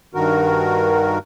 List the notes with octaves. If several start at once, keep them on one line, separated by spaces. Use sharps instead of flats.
G2 D#3 F#4 A#4